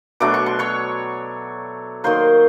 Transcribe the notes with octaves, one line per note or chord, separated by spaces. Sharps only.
B2 F#3 A3 D4 D6
C#6
C6
C#5 C#6
D#3 F#3 A#3 C5 C6